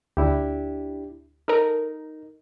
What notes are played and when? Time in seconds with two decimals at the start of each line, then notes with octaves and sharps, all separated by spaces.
0.17 D2 D4 E4 G4
1.48 D#4 A4 A#4